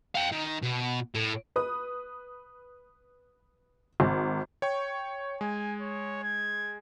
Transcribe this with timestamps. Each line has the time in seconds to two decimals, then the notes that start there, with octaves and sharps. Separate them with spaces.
0.15 F5 G5
0.32 D#3
0.62 B2
1.15 A2
1.56 B4 D#6
4.00 G#1
4.62 C#5 G5 C#6
5.41 G#3 G#5
5.81 C#5
6.23 G#6